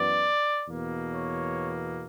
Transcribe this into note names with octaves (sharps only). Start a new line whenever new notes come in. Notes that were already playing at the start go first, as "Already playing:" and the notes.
Already playing: F#2 E3 B3 D5
E2 B2 A#3
C#5